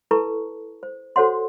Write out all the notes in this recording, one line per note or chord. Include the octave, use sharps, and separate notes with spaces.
E4 A4 B4 A5 A#5 C#6
C5
F#4 A4 C5 C#5 F#5 C6